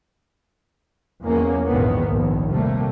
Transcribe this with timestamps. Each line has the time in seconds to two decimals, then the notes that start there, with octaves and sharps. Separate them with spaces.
1.23 E2 F#3 A#3 C#4
1.67 A#1 E2 G#2 D#3 A#3 B3
2.10 A#1 D#2
2.49 C3 G3 A3 A#3